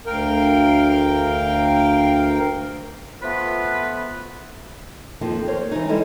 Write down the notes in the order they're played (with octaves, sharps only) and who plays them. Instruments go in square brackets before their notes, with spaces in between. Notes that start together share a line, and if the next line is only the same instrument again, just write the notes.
[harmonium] D2 A#4 F5 G5
[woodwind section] F3 A3 B3 F4 B4 B5
[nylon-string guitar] F2 D#3 F3 A#3 F4
A#4 C5 C#5
E3 G3 D#4
G3 G#3 B3 E4 A4 D#5